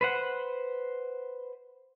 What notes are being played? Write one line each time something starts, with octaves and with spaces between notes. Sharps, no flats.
B4 C5 F#5